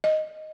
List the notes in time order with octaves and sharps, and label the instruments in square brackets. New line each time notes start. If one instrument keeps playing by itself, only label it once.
[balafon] D#5